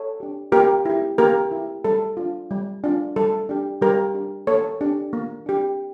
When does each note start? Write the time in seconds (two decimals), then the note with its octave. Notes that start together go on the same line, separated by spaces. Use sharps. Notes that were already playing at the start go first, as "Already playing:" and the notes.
Already playing: A4 C#5
0.20 D4 G4
0.52 A#3 G4 A#4
0.85 E4 G4
1.18 A#3 G4 A#4
1.52 E4 G4
1.84 G3 A4
2.17 D4 F4
2.51 G3
2.84 D4 F4
3.16 G3 A4
3.49 D4 G4
3.81 G3 G4 A#4
4.14 D4 G4
4.47 A#3 A4 C#5
4.81 D4 G4
5.13 A#3
5.46 D4 G4